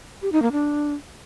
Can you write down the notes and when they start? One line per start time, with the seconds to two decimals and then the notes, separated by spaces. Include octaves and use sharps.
0.22 G4
0.32 D#4
0.42 A#3
0.52 D4